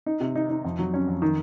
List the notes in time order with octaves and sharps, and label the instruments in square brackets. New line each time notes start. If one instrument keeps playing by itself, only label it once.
[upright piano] D#4
C3
D#4
D#4
F2
F#3
C#4
F2
D#3